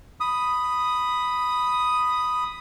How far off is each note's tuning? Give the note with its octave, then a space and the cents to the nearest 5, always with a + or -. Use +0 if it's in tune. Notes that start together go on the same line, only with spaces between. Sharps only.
B5 +0 D#6 +0